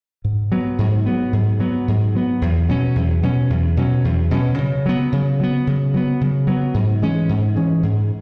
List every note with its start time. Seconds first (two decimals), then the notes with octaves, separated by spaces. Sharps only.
0.25 G#2
0.52 F#3 B3
0.79 G#2
1.06 F#3 B3
1.33 G#2
1.60 F#3 B3
1.88 G#2
2.15 F#3 B3
2.42 E2
2.69 B2 F#3 C#4
2.96 E2
3.23 B2 F#3 C#4
3.50 E2
3.77 B2 F#3 C#4
4.05 E2
4.31 B2 F#3 C#4
4.58 C#3
4.86 F#3 B3
5.12 C#3
5.40 F#3 B3
5.67 C#3
5.94 F#3 B3
6.21 C#3
6.47 F#3 B3
6.74 G#2
7.02 E3 G#3 C#4
7.29 G#2
7.56 E3 G#3 C#4
7.83 G#2